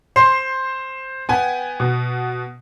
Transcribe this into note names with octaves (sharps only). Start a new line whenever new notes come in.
C5 C6 C7
B3 G5 G#5
B2